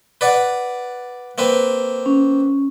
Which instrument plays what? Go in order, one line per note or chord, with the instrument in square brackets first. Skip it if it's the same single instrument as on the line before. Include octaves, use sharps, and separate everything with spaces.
[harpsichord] B4 D5 F#5
A#3 C4 B4
[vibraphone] C#4